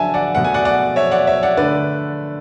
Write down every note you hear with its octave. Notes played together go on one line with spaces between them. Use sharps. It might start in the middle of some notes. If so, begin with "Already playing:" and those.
Already playing: D3 F#3 D5 E5 F#5 G#5 A5
D5 F#5
B2 A3 F#5
G#5
D5 F#5
D5 F#5
C#5 E5
D5 F#5
C#5 E5
D5 F#5
D3 A3 B4 D5